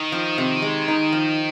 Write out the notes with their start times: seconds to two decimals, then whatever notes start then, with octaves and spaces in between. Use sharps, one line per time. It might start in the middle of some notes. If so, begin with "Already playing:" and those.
Already playing: D#3 D#4
0.12 F3
0.38 C3
0.62 G#3
0.88 D#4
1.12 F3